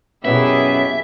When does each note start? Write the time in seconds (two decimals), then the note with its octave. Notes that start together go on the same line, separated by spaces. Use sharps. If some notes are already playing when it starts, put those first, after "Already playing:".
0.25 F#2 B2 B3 C#4 E4 G4 G#4 E5